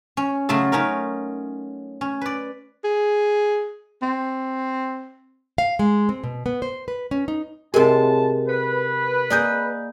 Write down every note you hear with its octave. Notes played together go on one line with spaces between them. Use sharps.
C#4
C#3 F#3 A3 F4 A4
A3 C#4 D#4 A#4
C#4
B4 D5
G#4
C4
F5
G#3
C4
B2
B3
C5
B4
C#4
D#4
A2 C3 G#3 G4 A#4 A5
B4
A#3 G#4 D5 D#5 G6